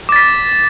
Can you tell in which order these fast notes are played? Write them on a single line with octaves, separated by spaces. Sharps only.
D6 A6 B6